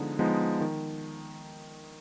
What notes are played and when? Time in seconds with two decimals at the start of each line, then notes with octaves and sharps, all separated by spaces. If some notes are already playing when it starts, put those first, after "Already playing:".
Already playing: D3 F3 G#3 B3 D#4
0.19 F3 G#3 B3 D#4
0.61 D#3